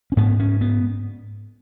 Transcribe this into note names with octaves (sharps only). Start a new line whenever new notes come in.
C#4
G#2 B3
C#4
B3